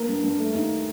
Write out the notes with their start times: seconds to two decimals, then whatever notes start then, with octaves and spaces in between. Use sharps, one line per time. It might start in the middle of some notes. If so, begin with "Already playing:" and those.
Already playing: A#3 A#4
0.09 G2
0.24 G2
0.39 A3
0.55 D#2